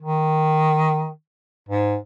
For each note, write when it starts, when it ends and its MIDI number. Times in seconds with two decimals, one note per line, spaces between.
0.02 1.09 51
1.69 1.96 44